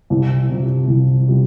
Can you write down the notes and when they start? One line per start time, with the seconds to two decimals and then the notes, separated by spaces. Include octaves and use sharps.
0.10 C2
0.49 C3 G3 F4
0.88 C2
1.28 C3 G3 F4